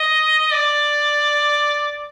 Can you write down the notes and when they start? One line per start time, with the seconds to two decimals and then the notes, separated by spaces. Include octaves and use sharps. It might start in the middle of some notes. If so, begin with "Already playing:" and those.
Already playing: D#5
0.53 D5